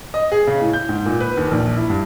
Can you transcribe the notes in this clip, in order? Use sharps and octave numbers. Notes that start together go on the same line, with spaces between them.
D#5
G#4
C#3
A2
G6
G#2
A#2
B4
D#2
A#1
E4
G2